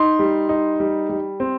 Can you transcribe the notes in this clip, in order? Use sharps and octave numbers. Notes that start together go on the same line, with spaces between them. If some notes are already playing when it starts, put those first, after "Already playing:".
Already playing: D#4 C6
G3
D#4
G3
G3
C4